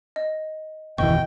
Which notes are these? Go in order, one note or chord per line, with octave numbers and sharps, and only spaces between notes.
D#5
F#1 D#2 B2 E3 D#5 G5 C#6